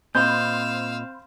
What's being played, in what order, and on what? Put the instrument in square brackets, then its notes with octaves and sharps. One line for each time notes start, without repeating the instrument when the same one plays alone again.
[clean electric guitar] A#2 D#5 [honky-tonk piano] C4 B5 C6 [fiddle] F5 E6 [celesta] G6